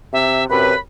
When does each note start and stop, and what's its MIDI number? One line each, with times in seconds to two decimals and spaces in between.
0.13 0.48 48
0.13 0.44 76
0.50 0.74 42
0.50 0.73 48
0.50 0.74 71
0.50 0.79 83